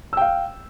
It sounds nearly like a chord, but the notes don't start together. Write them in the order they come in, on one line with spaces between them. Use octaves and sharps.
E6 G5 F5